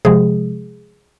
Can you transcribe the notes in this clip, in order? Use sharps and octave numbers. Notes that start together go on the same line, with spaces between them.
C3 F3 G#3 G#4